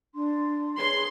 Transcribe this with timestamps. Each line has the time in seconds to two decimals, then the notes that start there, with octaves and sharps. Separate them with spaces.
0.13 D4 C6
0.79 G#4 B4 C#5 C6